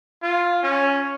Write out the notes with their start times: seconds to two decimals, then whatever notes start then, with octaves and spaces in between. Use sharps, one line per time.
0.22 F4
0.63 C#4